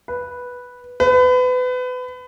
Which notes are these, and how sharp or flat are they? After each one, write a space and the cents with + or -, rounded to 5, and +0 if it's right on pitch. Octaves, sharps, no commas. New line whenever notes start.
B4 -5
B4 +30